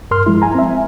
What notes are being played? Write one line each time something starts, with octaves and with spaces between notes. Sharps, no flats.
G2 A#4 C6 F6
F3 G#3 E4
G#5 A#5
C4 E5
G#5